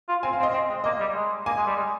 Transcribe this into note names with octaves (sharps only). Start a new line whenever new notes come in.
F4
C4 G#5
F5
C4
D#5
C4
G#3
A#3 D#5
G3
G#3
A#3 G#5
G#3
G3
G#3